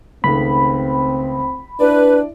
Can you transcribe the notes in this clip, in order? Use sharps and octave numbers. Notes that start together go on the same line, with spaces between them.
C#2 D#3 A3 C4 B5
D4 E4 B4 D5